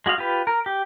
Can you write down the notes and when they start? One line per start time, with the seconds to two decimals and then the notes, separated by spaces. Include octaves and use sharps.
0.06 G#3 F#4 D#5 F5
0.18 F4 G4 B4
0.47 A#4
0.66 G4